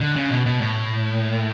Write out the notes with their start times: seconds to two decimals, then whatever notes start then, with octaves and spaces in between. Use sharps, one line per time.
0.01 D3
0.16 C#3
0.31 B2
0.46 B2
0.61 A2